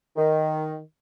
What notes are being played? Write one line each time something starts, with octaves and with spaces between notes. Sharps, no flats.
D#3